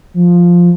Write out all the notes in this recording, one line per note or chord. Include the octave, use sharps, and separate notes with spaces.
F3